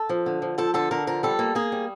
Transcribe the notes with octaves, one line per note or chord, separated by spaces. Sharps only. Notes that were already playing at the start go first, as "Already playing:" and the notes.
Already playing: A4
F3
D3
F3
F3 A4
D3 A4
D3 A#4
F3 A#4
G3 A4
A#3
A#3 G#4
G3